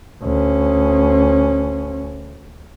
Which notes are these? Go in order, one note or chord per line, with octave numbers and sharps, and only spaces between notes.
D2 C#4